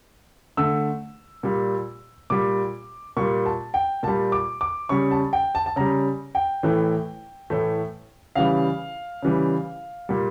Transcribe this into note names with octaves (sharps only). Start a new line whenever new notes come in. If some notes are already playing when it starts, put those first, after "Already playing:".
D3 A3 E6
A#2 G3
A#2 G3 D6
A#2 G3 C#6
A5
G5
A#2 G3 A5
D6
D6
C#3 G3 C#6
A5
G5
A5
A5
C#3 G3 A#5
G5
A2 E3 A3
A2 E3 A3
C#3 E3 G3 F5
C#3 E3 G3
A#2 G3